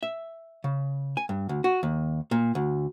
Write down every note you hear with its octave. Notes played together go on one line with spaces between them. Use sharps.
E5
C#3
G#5
G2
D2
F#4
D#2
A#2
D2